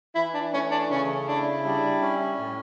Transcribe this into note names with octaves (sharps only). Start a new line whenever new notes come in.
E3 E4
D4
A3 C#4
D4
C#3 C#4
D4 E4
G3 D4
C#4
A2